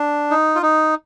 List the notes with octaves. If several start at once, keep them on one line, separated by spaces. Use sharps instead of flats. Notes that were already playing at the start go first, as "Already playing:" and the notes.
Already playing: D4
D#4
F4
D#4